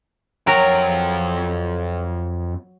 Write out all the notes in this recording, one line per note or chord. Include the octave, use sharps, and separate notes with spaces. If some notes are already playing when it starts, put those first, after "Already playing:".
F2 F#3 A#4 G5